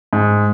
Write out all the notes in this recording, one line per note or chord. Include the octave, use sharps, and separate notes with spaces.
G#2